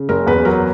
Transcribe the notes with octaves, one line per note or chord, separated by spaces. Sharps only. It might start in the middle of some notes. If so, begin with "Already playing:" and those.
Already playing: C#3
F#1 A#4
E2 B4
F#3 A#4